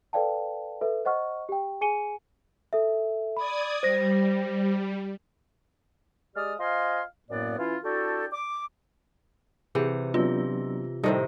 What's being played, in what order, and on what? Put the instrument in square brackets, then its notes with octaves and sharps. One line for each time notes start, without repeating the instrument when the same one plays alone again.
[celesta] A4 B4 D5 F5 G5 A5
A4 B4 E5
C5 D#5 F#5 C#6 F6
G4 G5
G#4 G#5 C#7 D#7 G7
A4 E5
[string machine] D5 D#6 G#6 [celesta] B5
[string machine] G3 [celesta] C5 A#6
[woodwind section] G#3 G4 D5 D#6 F6
F4 C5 D#5 F5 G#5 C6
F#2 A2 A#3 B3 D5
E3 C#4 E4 F4
D4 E4 F#4 G4 A4
D6
[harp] C3 [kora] E3 [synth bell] G#4
[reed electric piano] F#3 B3 D4 [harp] C4 [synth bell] F4
[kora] A2 C3 D#3 [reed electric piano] G3 A4 D#5